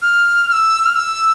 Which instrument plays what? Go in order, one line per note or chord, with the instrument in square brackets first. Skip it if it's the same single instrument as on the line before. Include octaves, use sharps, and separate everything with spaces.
[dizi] F6
F6
E6
F6
E6